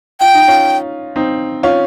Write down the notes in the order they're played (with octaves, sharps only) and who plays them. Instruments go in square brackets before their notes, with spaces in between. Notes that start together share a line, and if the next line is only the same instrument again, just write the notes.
[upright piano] F4 [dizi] G5
[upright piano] D#4
C#4 F4
C4 D#4
C#4 F4